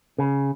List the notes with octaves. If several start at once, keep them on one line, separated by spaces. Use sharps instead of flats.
C#3